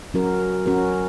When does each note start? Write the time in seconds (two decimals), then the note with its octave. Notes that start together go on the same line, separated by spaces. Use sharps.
0.14 F#3 C#4 F#4 A#4
0.66 F#3 C#4 F#4 A#4